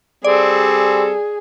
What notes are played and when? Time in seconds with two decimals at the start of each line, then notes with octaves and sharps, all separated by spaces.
0.24 G3 C4 G#4 A4 D5